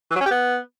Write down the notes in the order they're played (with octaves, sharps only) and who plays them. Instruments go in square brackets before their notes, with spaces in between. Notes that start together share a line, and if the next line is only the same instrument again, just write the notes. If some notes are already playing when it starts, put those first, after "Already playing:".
[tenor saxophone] E3
F#3
C#4
G4
B3